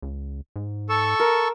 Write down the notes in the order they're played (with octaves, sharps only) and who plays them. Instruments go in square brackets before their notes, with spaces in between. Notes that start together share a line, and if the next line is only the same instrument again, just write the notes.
[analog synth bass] C#2
G#2
[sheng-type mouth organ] A4 C#6 E6
[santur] A#4